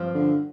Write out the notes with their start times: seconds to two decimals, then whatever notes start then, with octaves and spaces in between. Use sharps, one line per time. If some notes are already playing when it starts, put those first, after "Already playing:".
Already playing: G2 F3 C4
0.14 D3